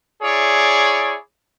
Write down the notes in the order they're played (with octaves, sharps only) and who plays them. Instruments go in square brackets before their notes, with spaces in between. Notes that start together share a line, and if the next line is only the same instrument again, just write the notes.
[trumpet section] E4 G#4 C#5 D5